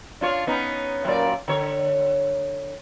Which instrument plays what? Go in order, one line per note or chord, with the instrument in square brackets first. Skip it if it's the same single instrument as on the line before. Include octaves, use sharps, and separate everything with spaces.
[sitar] D4 F4 C#5
B3 C#4 D#4
F#2 A#2 D5
D3 C#5